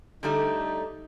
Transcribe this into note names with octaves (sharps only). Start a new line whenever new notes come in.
D3 G3 A3 D#4